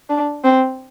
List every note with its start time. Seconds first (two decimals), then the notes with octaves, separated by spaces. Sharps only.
0.09 D4
0.44 C4